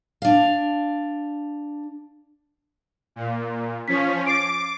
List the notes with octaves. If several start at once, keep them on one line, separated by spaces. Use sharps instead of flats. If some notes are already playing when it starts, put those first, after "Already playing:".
D4 F5
A#2
F3 C#4 B6
D6 A6 C7 D7